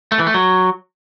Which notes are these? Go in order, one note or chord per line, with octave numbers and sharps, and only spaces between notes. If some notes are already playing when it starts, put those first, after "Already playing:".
A3
E3
A3
F#3